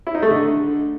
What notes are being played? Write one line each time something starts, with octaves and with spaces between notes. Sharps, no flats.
E4
D#4
A3
D3